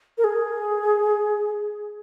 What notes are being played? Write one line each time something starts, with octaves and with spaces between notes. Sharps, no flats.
A#4
G#4